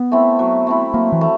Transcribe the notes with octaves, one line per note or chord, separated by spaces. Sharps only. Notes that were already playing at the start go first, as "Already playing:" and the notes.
Already playing: B3
A3 C4 E4
F#3
A3 C4 E4
F#3 A#3
E3
A3